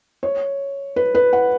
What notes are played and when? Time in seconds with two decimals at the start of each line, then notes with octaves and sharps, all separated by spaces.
0.23 C#5
0.96 B4
1.15 B4
1.33 F#5